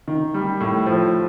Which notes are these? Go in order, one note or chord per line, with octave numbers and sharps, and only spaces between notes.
D#3
G3
A2
F3